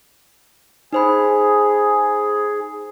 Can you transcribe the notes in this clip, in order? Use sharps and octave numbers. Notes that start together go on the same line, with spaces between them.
D#4 G#4 C5 B5